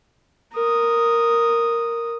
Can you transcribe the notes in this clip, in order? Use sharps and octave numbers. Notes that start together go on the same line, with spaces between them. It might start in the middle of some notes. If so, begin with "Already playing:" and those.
A#4 D#6